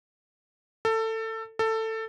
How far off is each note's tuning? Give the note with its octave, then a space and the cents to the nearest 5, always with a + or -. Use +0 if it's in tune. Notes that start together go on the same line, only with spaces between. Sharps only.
A4 +20
A4 +15